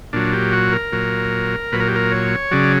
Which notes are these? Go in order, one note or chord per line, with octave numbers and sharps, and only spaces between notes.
A#2 F#3 D4
G4
F#4
A#4
A#2 F#3
A#2 F#3 B4
A#4
G4
A#4
C#5
C#3 F#3 D5